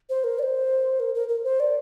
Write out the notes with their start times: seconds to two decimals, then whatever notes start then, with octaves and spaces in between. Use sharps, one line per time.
0.10 C5
0.24 A#4
0.39 D5
0.43 C5
1.00 A#4
1.15 A#4
1.29 A#4
1.44 C5
1.60 D5